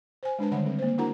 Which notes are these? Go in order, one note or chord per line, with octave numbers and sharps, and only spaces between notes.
C5 G#5
G#3 D4 B4 A5
D3 D#3 G3 C#5 F#5 B5
G3 C4 A4
A#3 C5
D4 E4 F#4 A#4 F#5 A#5